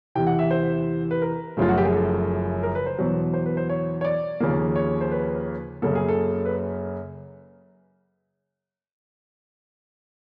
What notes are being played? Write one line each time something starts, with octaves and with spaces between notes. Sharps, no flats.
E2 C3 E3 G5
F#5
E5
C5
B4
A#4
F#1 F#2 C#3 F3 A3 F4
F#4
G4
G#4
A4
A#4
B4
C5
E2 B2 F#3
C5
B4
C5
C#5
C#5
D5
D#2 C#3 F3 A#3
C#5
C5
B4
F#2 C#3 F#3 A#3 A4
G#4
A4
B4